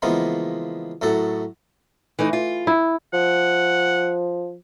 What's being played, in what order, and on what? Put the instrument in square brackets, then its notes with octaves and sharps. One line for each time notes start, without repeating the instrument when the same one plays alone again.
[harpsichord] C#3 E3 F3 G#3 A#3 B3
F#2 A2 F#3 A4 F#5
[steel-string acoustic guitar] E3 A3 D#4
F4
[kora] E4
[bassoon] F3 [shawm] F#5